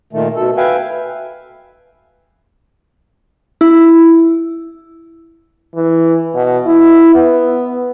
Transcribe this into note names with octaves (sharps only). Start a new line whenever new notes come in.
A#2 D#3 A3
B2 A4
B4 E5 F5 G5 G#5
E4
E3
B2
E4
B3